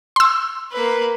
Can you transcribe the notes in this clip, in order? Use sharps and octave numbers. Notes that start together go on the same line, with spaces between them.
C6 E6
A#3 B4